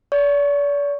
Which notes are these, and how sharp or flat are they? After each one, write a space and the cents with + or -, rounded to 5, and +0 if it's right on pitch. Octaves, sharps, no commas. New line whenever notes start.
D5 -40 C#6 +0